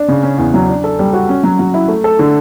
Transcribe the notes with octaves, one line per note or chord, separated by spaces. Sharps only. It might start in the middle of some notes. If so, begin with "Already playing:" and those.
Already playing: D4
C#3
C#4
E2
F#3
D4
A4
G3
F#4
C#4
F#3
F#3
E4
A3
A4
D3